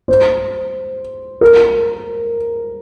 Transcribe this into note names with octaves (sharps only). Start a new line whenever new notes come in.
C5
A#4